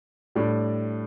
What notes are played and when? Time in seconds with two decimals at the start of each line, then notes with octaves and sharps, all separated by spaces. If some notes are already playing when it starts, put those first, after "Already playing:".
0.35 A2 G3 D4